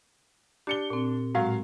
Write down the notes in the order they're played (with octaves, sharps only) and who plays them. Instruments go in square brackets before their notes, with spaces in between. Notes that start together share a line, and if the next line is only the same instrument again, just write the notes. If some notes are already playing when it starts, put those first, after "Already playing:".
[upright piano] D4 C#7 G7 [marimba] G4
[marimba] A#2 C4
[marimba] A2 G#3 [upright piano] F#3 F5